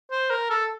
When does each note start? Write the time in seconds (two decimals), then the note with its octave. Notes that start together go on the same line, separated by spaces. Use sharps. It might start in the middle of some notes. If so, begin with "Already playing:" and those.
0.11 C5
0.30 A#4
0.50 A4